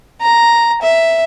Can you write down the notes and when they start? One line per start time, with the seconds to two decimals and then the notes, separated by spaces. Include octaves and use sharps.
0.22 A#5
0.82 E5